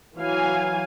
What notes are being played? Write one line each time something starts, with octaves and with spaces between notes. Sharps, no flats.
E3 F#3 F5 G#5